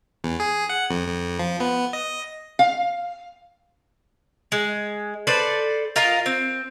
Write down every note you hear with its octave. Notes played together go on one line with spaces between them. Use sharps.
E2
G#4
F#5
F2
F2
F3
B3
D#5
F5
G#3
A4 B4 C5 D5
F4 A#4 D#5 F5
C4